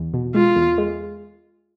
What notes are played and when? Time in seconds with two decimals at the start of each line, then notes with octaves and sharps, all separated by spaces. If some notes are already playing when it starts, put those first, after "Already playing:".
Already playing: E2
0.14 B2
0.35 G#3 F4
0.56 E2
0.78 G#3